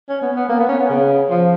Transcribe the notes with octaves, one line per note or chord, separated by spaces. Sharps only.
C#4
B3
B3
A#3
B3
C#4
B3
C#3
F3